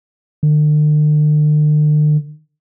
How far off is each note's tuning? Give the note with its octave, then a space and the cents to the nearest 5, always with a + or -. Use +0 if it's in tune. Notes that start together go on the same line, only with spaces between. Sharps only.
D3 +45